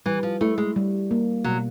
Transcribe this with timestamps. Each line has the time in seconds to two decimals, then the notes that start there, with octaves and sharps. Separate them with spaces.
0.06 E3 G3
0.23 F3
0.41 A3 E4
0.58 G#3
0.76 G3
1.11 A#3
1.44 B2 F#3